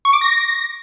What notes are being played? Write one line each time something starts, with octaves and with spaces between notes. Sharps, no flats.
C#6
D6
A#6